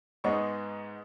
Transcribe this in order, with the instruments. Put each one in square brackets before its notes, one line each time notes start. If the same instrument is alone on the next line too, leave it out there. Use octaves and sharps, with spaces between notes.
[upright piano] G#2 G#3 B3 D#4 C#6